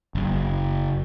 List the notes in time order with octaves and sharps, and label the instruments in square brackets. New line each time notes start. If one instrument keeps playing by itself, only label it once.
[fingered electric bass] F#1